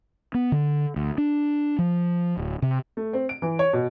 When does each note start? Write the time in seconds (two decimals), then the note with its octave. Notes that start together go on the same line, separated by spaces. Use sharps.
0.34 B3
0.52 D3
0.96 D2
1.18 D4
1.79 F3
2.37 D1
2.62 C3
2.97 A3
3.13 C4
3.29 D7
3.42 E3
3.59 C#5
3.73 B2